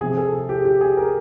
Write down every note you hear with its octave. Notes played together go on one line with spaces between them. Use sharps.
C3 F3 G#4
A4
G#4
G4
G4
G#4
A#4